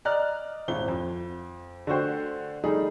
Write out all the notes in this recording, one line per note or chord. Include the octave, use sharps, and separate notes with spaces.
D5 D#5 A#5 F6 F#6
D#1 G#1 E4 G7
F2
D3 A3 F#4 C5 G5
G3 A3 D#4 G#4